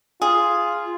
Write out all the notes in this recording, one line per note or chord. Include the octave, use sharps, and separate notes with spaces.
F4 G#4